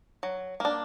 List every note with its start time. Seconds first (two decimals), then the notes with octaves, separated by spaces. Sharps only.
0.23 F#3
0.60 A#3 D4